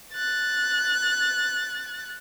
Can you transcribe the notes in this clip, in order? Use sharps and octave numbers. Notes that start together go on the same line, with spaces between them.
F#6 A6